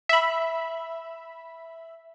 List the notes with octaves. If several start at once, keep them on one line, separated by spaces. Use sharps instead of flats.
E5 B5